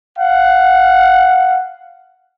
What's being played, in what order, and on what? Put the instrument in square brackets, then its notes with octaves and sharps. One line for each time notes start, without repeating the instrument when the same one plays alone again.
[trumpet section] F5 F#5